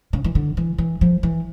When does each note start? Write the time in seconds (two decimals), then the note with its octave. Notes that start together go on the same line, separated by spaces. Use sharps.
0.13 C#3
0.24 E3
0.35 D3
0.57 E3
0.78 E3
1.01 F3
1.23 E3